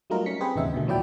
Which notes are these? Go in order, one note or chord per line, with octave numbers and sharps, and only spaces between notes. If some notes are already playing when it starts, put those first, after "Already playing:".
F#3 G3 A3 D#4 F4 A#4
C#4 B6 C#7
C4 G4 G#4 B4 C5
A1 D#2 C#3 B3 D#4 E5
B2 D3 D#3 A3
D#2 F3 F#3 E4 D5 G5